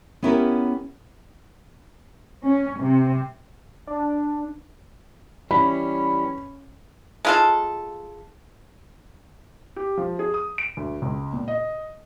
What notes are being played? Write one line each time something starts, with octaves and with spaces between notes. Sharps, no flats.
B3 C#4 E4 G4 A#4
C#4
C3
D4
E3 G3 C#4 B5
G#3 F4 A4
G4
F3
G#4
D#6
D7
D2
C#2
A#2
D#5